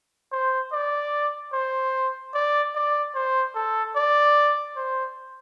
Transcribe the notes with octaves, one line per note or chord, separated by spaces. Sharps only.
C5
D5
C5
D5
D5
C5
A4
D5
C5